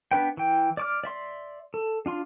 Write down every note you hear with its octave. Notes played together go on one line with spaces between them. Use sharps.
B3 D4 B4 G5
E3 G5
D5 D6 F6
D5 E5 C6
A4
D4 F4 C6